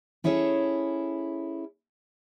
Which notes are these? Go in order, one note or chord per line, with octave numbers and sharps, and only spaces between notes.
C#4 E4 G#4 A4 C#5